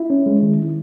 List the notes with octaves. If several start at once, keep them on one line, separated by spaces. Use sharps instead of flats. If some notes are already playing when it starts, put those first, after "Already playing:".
Already playing: E4
C#4
G#3
D#3